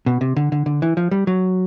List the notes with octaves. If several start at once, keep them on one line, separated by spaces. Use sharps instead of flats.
B2
C3
D3
D3
D3
E3
F3
G3
F#3